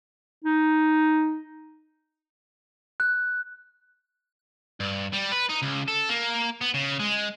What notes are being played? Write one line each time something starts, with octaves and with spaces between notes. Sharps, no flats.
D#4
F#6
G2
G3
B4
D#4
C#2
A4
A#3
B3
C#3
G#3